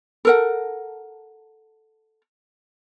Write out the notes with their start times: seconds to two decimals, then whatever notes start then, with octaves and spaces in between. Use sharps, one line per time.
0.25 A4 A#4 F#5